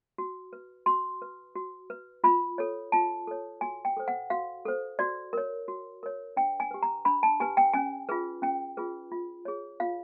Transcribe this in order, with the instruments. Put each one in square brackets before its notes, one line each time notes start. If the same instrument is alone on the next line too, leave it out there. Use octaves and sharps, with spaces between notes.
[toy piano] F#4
B4
F#4 C6
B4
F#4
B4
F4 B5
A4 C#5
F4 A5
A4 C#5
F#4 G#5
G5
A4 C5
F#5
F#4 F5
A4 C5
F#4 D5
A#4 C#5
F#4
A#4 C#5
D4 G5
G#5
G4 B4
A#5
D4 B5
A5
G4 B4 G#5
G5
C#4 G#5
F4 G#4 B4
C#4 G5
F4 G#4 B4
F4
G#4 C#5
F4 F5